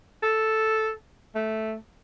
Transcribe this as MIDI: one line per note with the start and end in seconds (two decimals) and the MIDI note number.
0.23 0.91 69
1.35 1.75 57